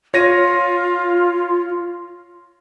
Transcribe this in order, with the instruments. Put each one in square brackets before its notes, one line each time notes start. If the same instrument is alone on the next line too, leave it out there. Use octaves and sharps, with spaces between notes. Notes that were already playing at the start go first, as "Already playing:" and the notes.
[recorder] F4 [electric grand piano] C#5 A#6 D#7